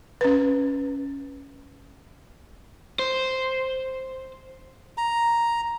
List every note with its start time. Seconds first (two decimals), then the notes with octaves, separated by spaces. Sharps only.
0.21 C#4 B4
2.99 C5
4.97 A#5